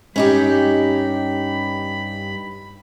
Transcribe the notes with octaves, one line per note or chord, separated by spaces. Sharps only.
G2 C#4 D#4 G4 B5